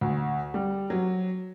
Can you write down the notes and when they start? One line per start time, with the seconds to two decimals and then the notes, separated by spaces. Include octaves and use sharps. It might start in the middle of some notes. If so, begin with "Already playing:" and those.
0.01 D2
0.54 G3
0.90 F#3